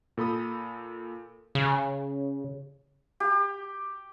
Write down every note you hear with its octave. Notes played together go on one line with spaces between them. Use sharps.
A#2 A4 B5 D#6
C#3
G4